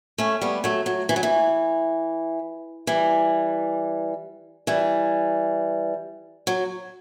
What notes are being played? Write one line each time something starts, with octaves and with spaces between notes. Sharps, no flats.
A3 C#4
G3 B3
F#3 A3
F#3
E3
F#3
E3
E3 G3
E3 G3
F#3